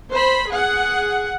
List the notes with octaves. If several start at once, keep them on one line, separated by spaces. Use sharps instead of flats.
C5 B5
G#4 F#5